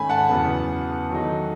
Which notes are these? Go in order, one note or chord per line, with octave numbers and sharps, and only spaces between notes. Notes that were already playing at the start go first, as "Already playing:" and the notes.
Already playing: G#2 D#3 A3 C#4 G#5 B5
F#5 A5
E2 C#3 F#3 B3
D#3 F#3 A3 D#4